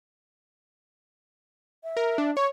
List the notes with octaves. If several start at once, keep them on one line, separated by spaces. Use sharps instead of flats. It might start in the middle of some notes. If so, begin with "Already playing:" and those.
E5
A#4
D4
C#5 C#6